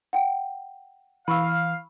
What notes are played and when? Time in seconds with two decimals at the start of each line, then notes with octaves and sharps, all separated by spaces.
0.13 F#5 G5
1.28 E3 F5 B5 C#6 E6